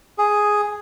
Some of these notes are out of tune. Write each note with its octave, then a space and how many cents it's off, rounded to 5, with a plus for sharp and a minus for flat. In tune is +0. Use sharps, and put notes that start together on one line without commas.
G#4 +0